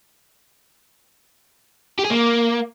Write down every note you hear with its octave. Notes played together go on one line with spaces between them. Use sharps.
G4
G#4
A#3